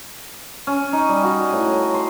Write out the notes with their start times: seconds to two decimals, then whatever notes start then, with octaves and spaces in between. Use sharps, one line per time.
0.67 C#4
0.93 D#4
1.09 G3
1.24 F#4
1.53 A2
1.94 C5